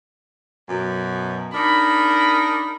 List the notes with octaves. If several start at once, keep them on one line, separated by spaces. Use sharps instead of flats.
F#2 B2
D4 D#4 A#4 B5